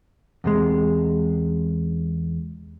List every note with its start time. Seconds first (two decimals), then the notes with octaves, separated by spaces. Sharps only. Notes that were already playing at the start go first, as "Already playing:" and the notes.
0.44 E2 C3 G#3